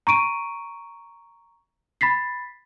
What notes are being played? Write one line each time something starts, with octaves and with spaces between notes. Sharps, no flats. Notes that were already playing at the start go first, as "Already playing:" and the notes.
A#5 C#6 D7 D#7
B5 A6 B6 C7